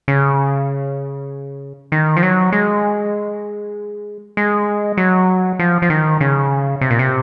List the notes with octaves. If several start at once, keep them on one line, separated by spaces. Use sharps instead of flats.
C#3
D#3
F3
F#3
G#3
G#3
F#3
F3
F3
D#3
C#3
C3
A#2
C3